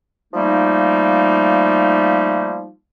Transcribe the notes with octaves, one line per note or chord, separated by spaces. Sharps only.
F3 G3 A3 A#3 D#4